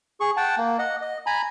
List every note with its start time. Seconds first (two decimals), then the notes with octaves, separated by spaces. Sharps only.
0.20 G#4 C#6
0.37 F#5 G5 A5
0.58 A#3
0.79 D#5 F#5
1.02 D#5
1.26 G#5 A#5 B5